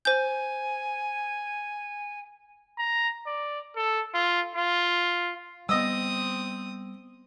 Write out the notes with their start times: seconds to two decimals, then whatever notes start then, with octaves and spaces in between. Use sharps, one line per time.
0.05 C5 G#5 G6
2.79 A#5
3.26 D5
3.76 A4
4.14 F4
4.56 F4
5.69 G3 B3 C4 D#5 D#6 E6